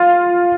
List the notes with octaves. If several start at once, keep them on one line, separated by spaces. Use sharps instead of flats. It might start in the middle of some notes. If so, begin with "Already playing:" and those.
Already playing: F4